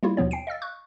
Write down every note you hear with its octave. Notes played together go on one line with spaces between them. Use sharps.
G3 A#3 E4 F4
D#2 B2 F3 B3 C#5
G5 C7 D7
D#5 F5 E6 A6
C#6 F#6